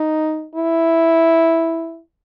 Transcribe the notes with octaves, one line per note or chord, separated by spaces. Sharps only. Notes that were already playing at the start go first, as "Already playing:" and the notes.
Already playing: D#4
E4